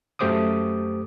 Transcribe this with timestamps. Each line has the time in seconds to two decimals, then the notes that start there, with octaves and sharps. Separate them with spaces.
0.19 F#2 A3 G4 C5 D6 D#6